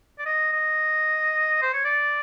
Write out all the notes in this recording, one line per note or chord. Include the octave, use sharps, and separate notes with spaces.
D5
D#5
D#5
C5
C#5
D5